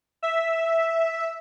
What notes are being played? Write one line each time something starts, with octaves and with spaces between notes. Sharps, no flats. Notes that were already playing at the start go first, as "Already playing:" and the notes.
E5